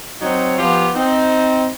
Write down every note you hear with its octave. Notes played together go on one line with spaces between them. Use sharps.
F#3 C4 D#4 C#5
F3 B3 F4 G4
C4 D#4